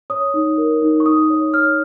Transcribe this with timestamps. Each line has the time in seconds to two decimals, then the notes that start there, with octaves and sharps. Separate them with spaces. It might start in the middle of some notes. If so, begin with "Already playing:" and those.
0.10 C#5 D#6
0.34 D#4
0.58 A#4
0.82 D#4
1.00 C#6
1.06 D#4 D#6
1.30 C#5
1.54 C#5 F6